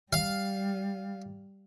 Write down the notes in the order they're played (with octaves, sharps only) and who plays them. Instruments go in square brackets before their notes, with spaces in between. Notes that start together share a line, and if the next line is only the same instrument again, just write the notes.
[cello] G3 [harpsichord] F5